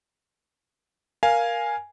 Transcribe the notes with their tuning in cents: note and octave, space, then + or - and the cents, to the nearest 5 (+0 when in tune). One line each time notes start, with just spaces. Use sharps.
A#4 +10 F5 -5 G#5 +0